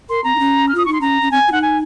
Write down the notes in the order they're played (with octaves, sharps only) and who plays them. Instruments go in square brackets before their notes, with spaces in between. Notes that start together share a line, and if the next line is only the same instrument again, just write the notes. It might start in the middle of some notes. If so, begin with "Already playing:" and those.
[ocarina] A#4 [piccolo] C6
[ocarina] C4 [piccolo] A#5
[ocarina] D#4
C#4
[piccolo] F6
[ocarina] F4 [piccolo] D#6
[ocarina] D#4 [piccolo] C#6
[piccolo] C6
[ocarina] C#4 [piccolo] A#5
[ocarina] C#4
[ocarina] C4 [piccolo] G#5
[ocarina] F4
[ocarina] D#4 [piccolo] F#5
[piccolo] G#5